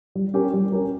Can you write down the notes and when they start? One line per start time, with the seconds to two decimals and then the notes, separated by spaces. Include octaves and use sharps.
0.15 G3
0.34 C#4 G4 A#4
0.54 G3
0.72 C#4 G4 A#4